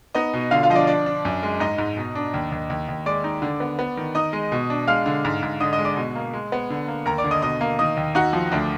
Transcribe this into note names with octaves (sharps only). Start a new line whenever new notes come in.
B3 D#4 D#5
B2
D3 F4 F5
F4 F5
F3 D#5
D4 D5
D4 D5
D4
F#2
G#3
G#2 D#4 D#5
G#2
B2
D4
D#2
D#2
D#2
D#2
G#3 D5 D6
D#4
D3
B3
B3
D#3
D#4 D#5 D#6
G#3
B2
D4
G#3 F5 F6
D3
G#2
G#2
D3 D#5 D#6
D#5 D#6
G#3
D5 D6
B2
A#3
G#3
B3
D3
A#3
D#2 A#4 A#5
D5 D6
D3
D#5 D#6
B2 D#5 D#6
A#3
D#3 D#5 D#6
D#2
D#4 F#4 F#5
F3
D2 D4 D5